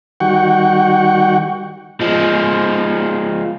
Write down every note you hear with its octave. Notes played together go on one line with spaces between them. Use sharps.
D#3 G3 F#4 F#5 G5 C#6
F3 G#3